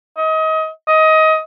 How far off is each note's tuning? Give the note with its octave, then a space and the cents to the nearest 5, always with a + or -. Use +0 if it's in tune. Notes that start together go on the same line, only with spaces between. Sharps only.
D#5 +30
D#5 +20